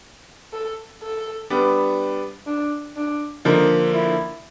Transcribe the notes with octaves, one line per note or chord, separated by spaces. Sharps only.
A4
A4
G3 B3 D4
D4
D4
D3 F3 A#3 D#4
E4